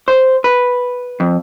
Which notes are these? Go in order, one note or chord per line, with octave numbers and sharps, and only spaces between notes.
C5
B4
F2